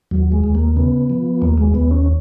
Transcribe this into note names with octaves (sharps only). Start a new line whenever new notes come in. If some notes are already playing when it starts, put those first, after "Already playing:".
D#2 F#3
G#3
D#2
A#3
C#3 B3
F3
D#2 A#3
G#3
D#2 B3
C#4